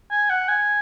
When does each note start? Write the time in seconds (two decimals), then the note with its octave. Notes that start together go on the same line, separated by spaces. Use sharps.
0.11 G#5
0.30 F#5
0.49 G#5